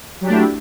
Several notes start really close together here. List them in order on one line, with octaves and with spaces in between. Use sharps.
F#3 G4 D4 A3 E4